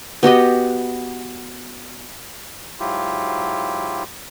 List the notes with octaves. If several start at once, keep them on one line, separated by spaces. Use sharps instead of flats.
B3 F#4 G4 D#5
G#2 F#3 E4 F4 G4